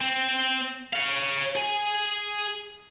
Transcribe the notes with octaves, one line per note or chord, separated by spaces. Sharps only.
C4
C#5 F5
G#4 G#5